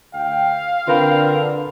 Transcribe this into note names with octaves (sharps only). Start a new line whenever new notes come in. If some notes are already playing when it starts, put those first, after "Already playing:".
D2 F5 G5
D3 C4 F4 A#4 B4 B5